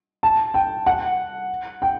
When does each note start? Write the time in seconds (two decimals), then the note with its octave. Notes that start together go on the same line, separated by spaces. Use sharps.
0.23 A5
0.54 G5
0.86 F#5
1.82 G5